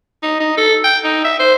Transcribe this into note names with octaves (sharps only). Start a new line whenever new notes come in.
D#4
D#4
A4
G5
D#4
E5
C5